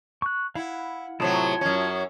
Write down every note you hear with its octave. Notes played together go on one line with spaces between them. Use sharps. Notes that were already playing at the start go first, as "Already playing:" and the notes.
C#6 F#6
E4 F5 F#5
A2 C3 F#3 E4 F4 A5
F#2 C#4